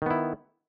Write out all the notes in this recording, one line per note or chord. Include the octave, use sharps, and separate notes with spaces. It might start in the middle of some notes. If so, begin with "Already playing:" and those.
D#3 B3 E4